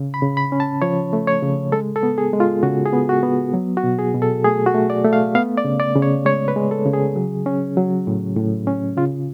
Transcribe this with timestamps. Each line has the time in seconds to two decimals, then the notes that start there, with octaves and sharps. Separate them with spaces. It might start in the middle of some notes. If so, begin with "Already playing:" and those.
Already playing: C#3
0.14 B5
0.22 C#3
0.37 B5
0.52 C#4
0.60 A5
0.82 F3 C#5
1.13 A3
1.27 C#5
1.42 C#3
1.72 G#3 A4
1.96 A4
2.03 B3
2.18 G#4
2.33 G#3
2.40 F4
2.63 C#3 F#4
2.86 G#4
2.93 B3
3.09 F#4
3.23 B3
3.54 F#3
3.77 F#4
3.84 B2
3.99 G#4
4.15 B2
4.22 A4
4.45 A3 G#4
4.66 F#4
4.75 A3
4.90 D5
5.05 A3
5.13 F5
5.35 B3 F5
5.58 D5
5.65 C#3
5.80 D5
5.95 C#3
6.02 C#5
6.25 G#3 C#5
6.48 B4
6.56 G#3
6.71 A4
6.86 C#3
6.93 G#4
7.16 F#3
7.46 C#4
7.77 F#3
8.07 A2
8.36 A2
8.67 C#4
8.97 C#3 F4